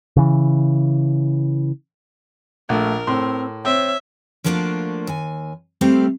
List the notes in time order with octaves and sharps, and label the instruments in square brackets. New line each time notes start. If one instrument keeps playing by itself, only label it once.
[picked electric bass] C#3 E3
[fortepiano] A#1 [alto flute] A3 [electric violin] A#4
[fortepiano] A2 C6 [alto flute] C4
[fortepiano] C4 [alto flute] C#5 [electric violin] E5
[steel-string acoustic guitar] F3 A3 A#3 D4 F4 F#4
D#2 G#5
G3 A3 C4 A4 C5 F5